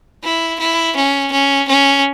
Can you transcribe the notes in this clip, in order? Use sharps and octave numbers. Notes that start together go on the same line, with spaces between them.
E4
E4
C#4
C#4
C#4